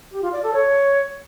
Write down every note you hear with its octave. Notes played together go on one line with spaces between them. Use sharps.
G4
F4
D5
A4
C#5